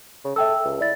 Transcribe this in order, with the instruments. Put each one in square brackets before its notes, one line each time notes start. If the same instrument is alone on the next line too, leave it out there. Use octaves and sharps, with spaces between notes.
[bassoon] C#3
[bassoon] A4 [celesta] E5 G5 E6
[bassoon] C#2
[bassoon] E4 [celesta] D5 A6